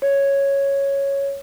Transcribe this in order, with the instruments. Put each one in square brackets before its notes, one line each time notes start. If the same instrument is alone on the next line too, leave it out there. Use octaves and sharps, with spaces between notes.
[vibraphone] C#5